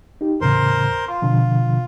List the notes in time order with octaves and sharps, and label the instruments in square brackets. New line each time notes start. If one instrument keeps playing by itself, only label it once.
[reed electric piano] D#4 G4
[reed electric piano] E2 A2 C#3 [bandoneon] A#4 C5 C6
[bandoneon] F4 [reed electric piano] C6
[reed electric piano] B2 D3 F3